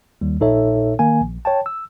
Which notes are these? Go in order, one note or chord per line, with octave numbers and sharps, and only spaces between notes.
D#2 D#3 G3
A#1 A#2 D#4 A4 C#5 E5
D#3 A#3 G#5
A#1
C#5 G5 A5
E6